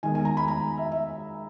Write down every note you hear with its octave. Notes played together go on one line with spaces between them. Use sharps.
D#3 G#3 B3 G#5
G#5
A#5
B5
A#5
E5
E5